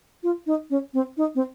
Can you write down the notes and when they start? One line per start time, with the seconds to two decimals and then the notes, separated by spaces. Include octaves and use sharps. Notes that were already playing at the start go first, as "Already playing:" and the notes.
0.23 F4
0.47 D#4
0.70 C#4
0.94 C4
1.17 D#4
1.35 C4